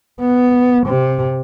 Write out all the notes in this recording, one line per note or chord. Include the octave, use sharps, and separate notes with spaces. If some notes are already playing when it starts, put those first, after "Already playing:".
B3
C3